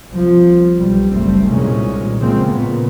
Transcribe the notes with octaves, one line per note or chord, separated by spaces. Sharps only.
C2 F3
B1 G3
F#1 G3 A3 C4
C2 A#2 D#3 G#3 C#4
A#2 C#3 F3 G#3 A#3 C4
A#2 C#3 A#3 B3